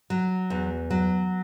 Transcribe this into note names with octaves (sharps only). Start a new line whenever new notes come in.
F#3
E2
F#3